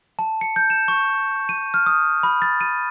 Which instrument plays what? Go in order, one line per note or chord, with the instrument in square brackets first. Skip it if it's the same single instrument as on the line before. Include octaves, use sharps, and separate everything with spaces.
[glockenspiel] A5
C#7
G6
E7
C#6
D#7
F6
D#6
B5
A6
D#7